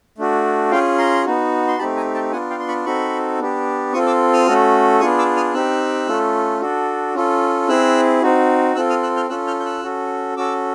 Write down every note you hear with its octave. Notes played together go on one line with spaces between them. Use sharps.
A3 D4 F#4
C#4 F4 G#4 F5 G5
A#5 C6
B3 D#4 F#4
C6
A3 C4 D#4 G4 A5 B5
G#5 A#5
G5 A5
B3 D4 F4 F#5 G#5
F5 G5
C6
B5 C#6
C4 D#4 F#4 A4 B5 C#6
B3 D4 G4
C4 F4 A4 C#6 D#6
D6 E6
D#6 F6
A3 C#4 F#4 A4
B3 D4 F4 G#4 C#6 D#6
D6 E6
D#6 F6
C4 D#4 G4 E6 F#6
A3 C#4 F4 A4
D4 F#4 A4
C#4 F4 A4
C4 E4 G#4 E6 F#6
C4 D#4 F#4
C4 F4 A4 E6 F#6
D#6 F6
E6 F#6
F6 G6
C#4 F4 A4 E6 F#6
F6 G6
G6
E6 F#6
C#4 F#4 A4
C#4 F#4 A4 D6 E6